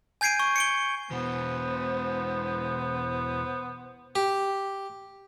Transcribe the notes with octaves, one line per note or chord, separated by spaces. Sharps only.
G#5 G6 G#6 C7 D7 D#7
C#6
C#7 D7 G7
E2 B2 B3 C5
G4